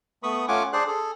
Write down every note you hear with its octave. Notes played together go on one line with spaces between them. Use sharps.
A3 B3 B4 B5 C#6 D#6
A3 C#4 F4 F#5 G#5 D6
D4 G#4 C5 D5 F#6
G#4 A4